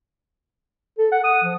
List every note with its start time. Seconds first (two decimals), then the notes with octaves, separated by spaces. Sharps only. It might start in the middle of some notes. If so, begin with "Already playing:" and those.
0.98 A4
1.12 F#5
1.24 D#6
1.43 F3